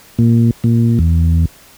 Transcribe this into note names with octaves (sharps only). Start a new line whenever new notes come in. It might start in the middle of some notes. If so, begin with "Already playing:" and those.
A#2
A#2
E2